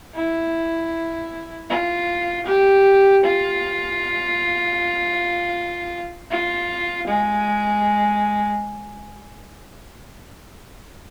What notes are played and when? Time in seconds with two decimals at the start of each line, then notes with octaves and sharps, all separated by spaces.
0.15 E4
1.70 F4
2.46 G4
3.23 F4
6.30 F4
7.07 G#3